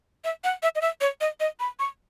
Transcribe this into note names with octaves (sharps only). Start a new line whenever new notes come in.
E5
F#5
E5
D#5
E5
C#5
D#5
D#5
B5
C#6